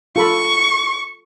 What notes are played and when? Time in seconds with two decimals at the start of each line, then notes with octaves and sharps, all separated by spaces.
0.16 F4 A4 B5 C#6